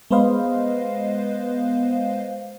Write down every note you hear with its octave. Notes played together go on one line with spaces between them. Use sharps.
G#3 B3 B4 C5 D#5 F5